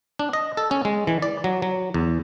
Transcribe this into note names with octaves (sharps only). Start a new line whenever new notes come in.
D4
D#5
A4
C#4
G#3
E3
D5
F#3
F#3
E2